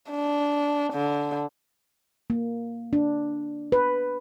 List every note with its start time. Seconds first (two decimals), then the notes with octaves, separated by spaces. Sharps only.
0.10 D4
0.93 D3
2.30 A#3
2.93 D4
3.72 B4